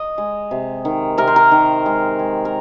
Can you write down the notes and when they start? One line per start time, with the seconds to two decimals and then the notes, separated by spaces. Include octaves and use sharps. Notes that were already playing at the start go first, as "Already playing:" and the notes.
Already playing: D#5
0.18 G#3
0.51 C3
0.85 D#3
1.18 C3 A#4
1.27 C5
1.36 A#4
1.51 D#3
1.86 G#3
2.19 G#3
2.45 A#4